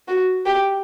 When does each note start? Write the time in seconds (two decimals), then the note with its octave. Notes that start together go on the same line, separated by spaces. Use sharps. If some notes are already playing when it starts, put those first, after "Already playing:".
0.08 F#4
0.46 G4